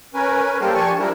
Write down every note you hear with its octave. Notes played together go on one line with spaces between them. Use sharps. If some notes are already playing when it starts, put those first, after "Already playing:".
C#4 A#4 B4 G#5
G3 A#3 G4 A4 A#4 C5
F3 D4 G4 G#5 A5 C#6
F3 G3 A3 D4 E4 A#4